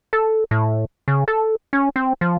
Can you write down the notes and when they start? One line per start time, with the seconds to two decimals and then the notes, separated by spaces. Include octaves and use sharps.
0.13 A4
0.51 A2
1.08 C#3
1.28 A4
1.73 C#4
1.96 C4
2.21 F3